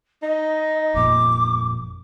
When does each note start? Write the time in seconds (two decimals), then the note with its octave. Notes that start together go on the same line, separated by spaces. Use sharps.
0.22 D#4 D#5
0.94 G1 F2 A#2 D6